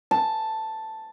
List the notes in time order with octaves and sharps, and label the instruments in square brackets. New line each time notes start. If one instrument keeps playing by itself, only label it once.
[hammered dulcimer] A5